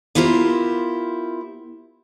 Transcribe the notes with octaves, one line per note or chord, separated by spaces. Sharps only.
B3 E4 F4 G4 A#4 C5